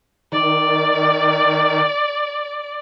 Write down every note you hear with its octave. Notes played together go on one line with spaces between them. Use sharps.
D#3 D5